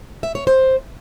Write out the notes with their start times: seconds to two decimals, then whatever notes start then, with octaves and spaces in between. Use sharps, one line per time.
0.23 E5
0.35 C#5
0.47 C5